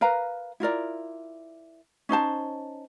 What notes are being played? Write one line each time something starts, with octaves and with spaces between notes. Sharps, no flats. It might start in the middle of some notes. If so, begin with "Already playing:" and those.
A#4 B4 F5 A#5
E4 F4 A#4 D5
C#4 D#4 C5 A5